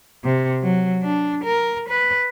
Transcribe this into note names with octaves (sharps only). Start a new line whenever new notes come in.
C3
F#3
D4
A#4
B4